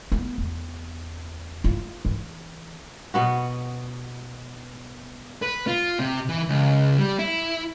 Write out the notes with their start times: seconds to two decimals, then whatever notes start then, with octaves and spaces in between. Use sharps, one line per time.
0.12 B3
0.38 E2
1.64 F4
2.05 E3
3.14 B2 B3 F#4
5.42 B4
5.67 F4
5.99 C3
6.29 E3
6.48 C#2
6.98 G3
7.19 E4